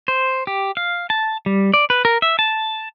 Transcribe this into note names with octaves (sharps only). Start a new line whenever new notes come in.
C5
G4
F5
A5
G3
D5
B4
A#4
E5
A5